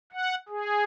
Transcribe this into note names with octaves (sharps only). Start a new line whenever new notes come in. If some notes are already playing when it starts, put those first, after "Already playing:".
F#5
G#4